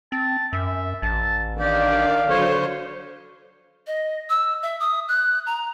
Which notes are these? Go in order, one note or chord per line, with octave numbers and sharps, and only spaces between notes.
C4 A5
F#2 E5
A1 A5
D#3 D4 G4 D5 F5
D3 F#3 C5 C#5
D#5
E6
E5
D#6
F#6
A#5